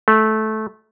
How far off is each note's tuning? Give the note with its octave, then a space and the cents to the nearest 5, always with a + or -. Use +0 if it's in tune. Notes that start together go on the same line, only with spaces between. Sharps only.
A3 -15